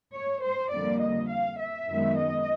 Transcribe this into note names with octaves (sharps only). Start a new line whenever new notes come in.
C#5
C5
F2 D3 G3 A#3 D5
D#5
F5
E5
F#2 D#3 G#3 B3
D#5